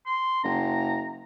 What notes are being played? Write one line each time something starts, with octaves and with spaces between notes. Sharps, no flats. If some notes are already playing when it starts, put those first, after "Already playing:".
C6
F#1 A#5